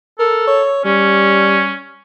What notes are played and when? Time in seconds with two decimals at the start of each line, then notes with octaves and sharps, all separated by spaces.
0.19 A4 A#4
0.47 C#5
0.85 G3 C#4